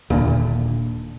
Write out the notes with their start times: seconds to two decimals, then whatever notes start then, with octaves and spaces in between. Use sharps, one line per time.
0.10 D#1 A#2 D3